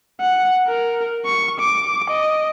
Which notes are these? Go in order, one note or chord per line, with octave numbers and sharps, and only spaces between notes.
F#5
A#4
C#6
D6
D#5